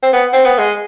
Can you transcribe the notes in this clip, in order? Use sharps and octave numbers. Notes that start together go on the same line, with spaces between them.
C4
B3
C4
B3
G#3